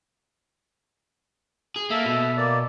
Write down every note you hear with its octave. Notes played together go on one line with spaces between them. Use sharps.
G#4
A#3 A4 E5
B2
A#3 D5